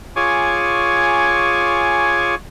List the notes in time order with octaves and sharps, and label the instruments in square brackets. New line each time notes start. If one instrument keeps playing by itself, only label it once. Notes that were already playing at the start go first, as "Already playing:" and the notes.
[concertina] F4 G#4 C#5 G#5 C#6 D6